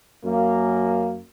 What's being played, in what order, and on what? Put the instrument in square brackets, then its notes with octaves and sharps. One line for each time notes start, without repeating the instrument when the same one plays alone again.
[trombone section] F#2 A#3